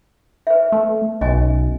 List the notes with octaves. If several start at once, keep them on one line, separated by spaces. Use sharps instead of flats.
B4 E5
A3
B1 C#4 D#5 G#5